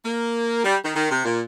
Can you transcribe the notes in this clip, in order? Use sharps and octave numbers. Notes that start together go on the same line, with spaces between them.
A#3
G3
D#3
D#3
C3
A#2